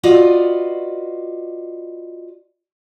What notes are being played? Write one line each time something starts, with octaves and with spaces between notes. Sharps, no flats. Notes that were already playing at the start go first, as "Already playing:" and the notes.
F4 F#4 B4 D5 D#5